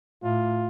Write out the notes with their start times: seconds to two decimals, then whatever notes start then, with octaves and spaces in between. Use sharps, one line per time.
0.23 A2 F4